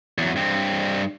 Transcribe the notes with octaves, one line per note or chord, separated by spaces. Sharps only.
E2 F#3
G2 C4